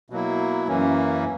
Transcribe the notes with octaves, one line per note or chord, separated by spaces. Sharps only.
B2 F#3 A#3 E4
F#2 E3 A#3 C#4